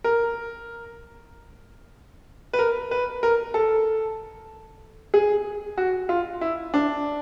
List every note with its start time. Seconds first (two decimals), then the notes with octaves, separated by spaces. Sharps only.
0.04 A#4
2.53 B4
2.59 A#4
2.91 B4
3.23 A#4
3.54 A4
5.14 G#4
5.78 F#4
6.09 F4
6.41 E4
6.74 D4